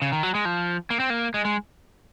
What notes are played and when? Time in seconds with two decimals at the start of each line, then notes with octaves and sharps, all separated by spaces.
0.02 C#3
0.12 D#3
0.23 F#3
0.35 G#3
0.45 F3
0.90 A#3
1.00 C4
1.10 A#3
1.34 G#3
1.45 G#3